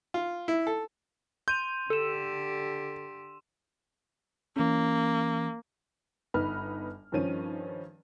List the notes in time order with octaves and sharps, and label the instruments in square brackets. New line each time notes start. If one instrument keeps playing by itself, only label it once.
[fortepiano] F4
E4
A4
[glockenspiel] C6 D#7 F7 [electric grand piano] G6
[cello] D3 G4 [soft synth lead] A4 [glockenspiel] E6 E7
[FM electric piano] E3 C#4 [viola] A#3
[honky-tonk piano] G1 B3 D#4 B4 B5 F6
G2 D#3 F3 C#4 D#7